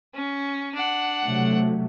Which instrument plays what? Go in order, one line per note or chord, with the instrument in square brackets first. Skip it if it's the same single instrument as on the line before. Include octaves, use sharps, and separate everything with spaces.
[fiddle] C#4
D4 F#5
[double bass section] C3 F#3 A3